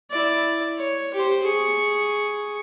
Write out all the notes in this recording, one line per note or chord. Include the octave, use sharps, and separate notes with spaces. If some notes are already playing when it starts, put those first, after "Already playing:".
E4 D5
C#5
G4 C5
G#4 C#6